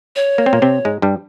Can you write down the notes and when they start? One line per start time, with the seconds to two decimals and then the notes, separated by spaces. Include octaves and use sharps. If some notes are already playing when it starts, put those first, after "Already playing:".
0.16 C#5
0.38 A#3
0.46 C4
0.53 A#2 A#3
0.62 C3 C4
0.85 G#2 G#3
1.02 G2 G3